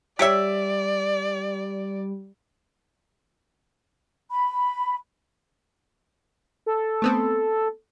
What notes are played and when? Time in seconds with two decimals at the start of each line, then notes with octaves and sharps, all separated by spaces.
0.19 G3 G4 C#5 D5 E5
4.31 B5
6.66 A4
7.02 A3 B3 C4